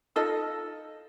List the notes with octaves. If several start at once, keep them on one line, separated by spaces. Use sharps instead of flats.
D#4 F4 A4 D#5